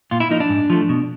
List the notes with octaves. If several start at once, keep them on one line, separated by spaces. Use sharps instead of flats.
A#2 F4
E4
F3 A#3 D#4
D4
G#2
F3 A3
B2